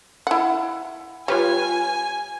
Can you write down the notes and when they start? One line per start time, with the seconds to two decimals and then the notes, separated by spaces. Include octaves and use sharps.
0.27 E4 F#5
1.28 G3 F4 B4 C#5 G#5